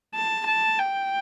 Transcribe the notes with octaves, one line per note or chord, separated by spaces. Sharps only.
A5
A5
G5